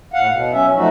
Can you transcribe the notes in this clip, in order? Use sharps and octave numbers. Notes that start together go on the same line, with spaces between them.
A2 F5 F#5
B2
F#3 C#4 E5
F3 F#3 A3 D#4 F#4